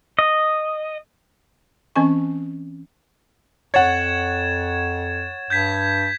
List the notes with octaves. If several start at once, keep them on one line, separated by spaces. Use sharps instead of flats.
D#5
E3 C4 C#4 D#5 G#5 C#6
F2 C#5 F#5 G#6 A6 E7
G2 G6 G#6 B6